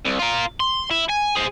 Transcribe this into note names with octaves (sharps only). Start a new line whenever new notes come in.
C2
F4 A#4
C6
E4
G#5
G#4 C5